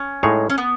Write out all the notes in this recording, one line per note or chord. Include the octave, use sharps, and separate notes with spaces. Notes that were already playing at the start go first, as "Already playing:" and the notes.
Already playing: C#4
A2 G#3 D#4 G#4 C#5
C#4
B3